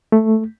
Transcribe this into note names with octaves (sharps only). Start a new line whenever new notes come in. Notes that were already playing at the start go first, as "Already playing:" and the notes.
A3